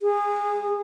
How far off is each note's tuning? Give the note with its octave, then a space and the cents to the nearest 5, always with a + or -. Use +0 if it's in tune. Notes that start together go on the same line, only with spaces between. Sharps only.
G#4 -20